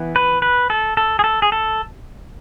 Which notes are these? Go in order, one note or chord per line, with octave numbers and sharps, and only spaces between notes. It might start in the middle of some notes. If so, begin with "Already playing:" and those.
Already playing: E3 B3
B4
B4
A4
A4
G#4
A4
G#4
A4